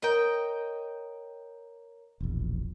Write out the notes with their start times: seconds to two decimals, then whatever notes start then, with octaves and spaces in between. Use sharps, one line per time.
0.02 A#4 C#5 D#5 G5
2.21 E1 A#1